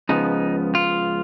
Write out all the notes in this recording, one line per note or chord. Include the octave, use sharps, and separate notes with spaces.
C#2 C#3 F3 B3 D#4
F4